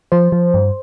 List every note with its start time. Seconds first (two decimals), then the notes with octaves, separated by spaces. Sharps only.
0.12 F3 C5
0.32 F3
0.54 G2